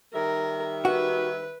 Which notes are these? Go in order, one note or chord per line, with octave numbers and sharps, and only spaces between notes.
D#3 G3 A#4 E5
F#4 B4